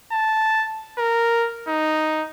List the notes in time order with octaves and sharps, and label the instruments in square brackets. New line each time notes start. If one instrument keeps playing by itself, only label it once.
[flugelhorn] A5
A#4
D#4